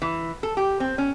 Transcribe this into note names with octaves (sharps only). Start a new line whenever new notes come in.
E3
A4
G4
C4
C#4